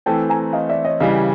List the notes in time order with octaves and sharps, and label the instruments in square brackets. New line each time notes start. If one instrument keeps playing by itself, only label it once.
[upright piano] E3 A3 C4 [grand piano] G5 A5
[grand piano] G#5 A#5
D#5 F5
D5 E5
C#5 D#5
[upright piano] C#3 E3 G3 [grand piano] D#5 F5